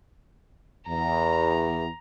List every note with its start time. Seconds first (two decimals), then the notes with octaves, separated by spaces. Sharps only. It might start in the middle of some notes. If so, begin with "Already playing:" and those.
0.89 E2 A#5